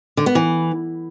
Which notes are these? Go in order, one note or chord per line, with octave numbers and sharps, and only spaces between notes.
D3
B3
E3